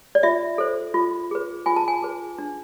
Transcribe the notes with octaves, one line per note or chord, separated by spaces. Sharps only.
D5
F4 E5
A4 C5
F4
G#4 B4
F4 G#5
A5
G#5
G#4 B4
D4